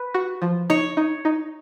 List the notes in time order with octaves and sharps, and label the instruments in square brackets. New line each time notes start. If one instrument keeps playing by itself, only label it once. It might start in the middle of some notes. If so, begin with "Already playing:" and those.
Already playing: [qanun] B4
[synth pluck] F#4
F3
[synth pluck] D#4 [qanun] C#5
[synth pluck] D#4
D#4